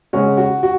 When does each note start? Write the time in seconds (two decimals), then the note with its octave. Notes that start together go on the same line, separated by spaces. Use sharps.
0.13 C#3 G#3 C#4 F#4
0.37 F#4
0.63 F#4